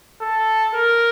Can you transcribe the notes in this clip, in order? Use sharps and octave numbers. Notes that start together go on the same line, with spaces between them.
A4
A#4